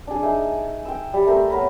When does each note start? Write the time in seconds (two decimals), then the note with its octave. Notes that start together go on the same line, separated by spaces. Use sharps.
0.07 D4 G#4
0.23 D#4 G#4 E5
0.85 G5 E6
1.14 G3
1.27 A3 A#4 C5 E6
1.50 B3 A#4 C#5 B5